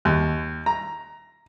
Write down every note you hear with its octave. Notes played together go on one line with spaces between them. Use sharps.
D#2
A#5